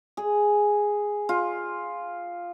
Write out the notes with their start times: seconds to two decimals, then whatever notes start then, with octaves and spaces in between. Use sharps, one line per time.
0.17 G#4
1.29 F4